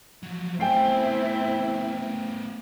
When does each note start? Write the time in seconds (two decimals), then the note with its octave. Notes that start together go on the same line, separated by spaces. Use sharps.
0.23 F3 F#3
0.60 A3 B3 C4 E4 G5 G#5 C7